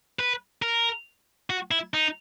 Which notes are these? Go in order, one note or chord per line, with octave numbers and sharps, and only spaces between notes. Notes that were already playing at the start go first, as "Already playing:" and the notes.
B4
A#4
F#4
E4
D#4